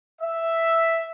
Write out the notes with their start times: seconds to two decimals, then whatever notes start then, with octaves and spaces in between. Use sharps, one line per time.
0.22 E5